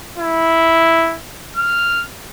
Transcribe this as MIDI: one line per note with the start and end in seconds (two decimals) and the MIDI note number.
0.18 1.16 64
1.57 2.05 89